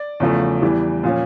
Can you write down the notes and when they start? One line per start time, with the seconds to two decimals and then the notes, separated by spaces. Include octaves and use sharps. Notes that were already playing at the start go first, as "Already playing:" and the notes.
Already playing: D5
0.20 E2 C#3 F3 A3
0.62 E2 E3 G3
1.04 A#2 F3 C#4